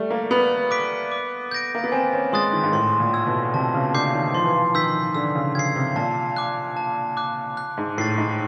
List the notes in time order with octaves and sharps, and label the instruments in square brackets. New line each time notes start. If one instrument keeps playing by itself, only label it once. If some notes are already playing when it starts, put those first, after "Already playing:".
Already playing: [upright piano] G3 A3
A#3
[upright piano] B3 [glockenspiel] B5
[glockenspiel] D6 F#6 B6 D7
D6
G6 A#6 D7
[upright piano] A#3
B3
[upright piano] C4 [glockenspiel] G#5
[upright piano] C#4
[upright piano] G#3 [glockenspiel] C6 D#6 F#6 A6
[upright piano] D#3
G#2
[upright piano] A2 [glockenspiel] C6
[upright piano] A#2
[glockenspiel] E6 G#6
[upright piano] B2
[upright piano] C3 [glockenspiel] A5
[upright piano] C#3
[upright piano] D3 [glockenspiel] D6 G6 C7
[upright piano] D#3
[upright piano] F3 [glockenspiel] C6
[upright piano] E3
F3
[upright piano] D#3 [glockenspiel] E6 G6 B6
[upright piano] D3 [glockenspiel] E6
[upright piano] C#3
[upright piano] C#3 [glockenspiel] G#6 C7
[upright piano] C3
[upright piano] A#2 [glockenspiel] A5
[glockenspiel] D6 F#6
A5
D6 F#6
F#6
[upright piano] G#2
[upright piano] A2 [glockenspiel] A6 C7
[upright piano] G#2